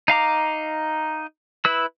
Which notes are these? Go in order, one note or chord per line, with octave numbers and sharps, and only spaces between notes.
D#4 F5 A#5 D6
E4 B4 E6